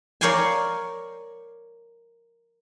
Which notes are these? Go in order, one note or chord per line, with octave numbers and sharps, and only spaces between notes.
A#4 C#5 D5 F5 G5 G#5